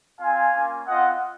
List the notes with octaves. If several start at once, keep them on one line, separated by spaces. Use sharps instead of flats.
C4 F4 F5 G#5
A#3 C#4 F4
C4 F4 D#5 F#5